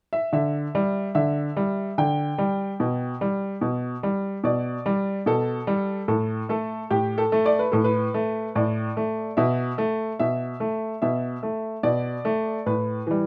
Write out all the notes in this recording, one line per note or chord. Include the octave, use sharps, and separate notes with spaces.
E5
D3 E5
G3
D3 E5
G3
D3 G5
G3
B2
G3
B2
G3
B2 D5
G3
B2 A4
G3
A2 A4
A3 A4
A2 G4
A4
A3
D5
B4
A2 A4
B4
A3
A2 D5
A3
B2 E5
A3
B2 E5
A3
B2 E5
A3
B2 D5
A3
A2 B4
E3 G3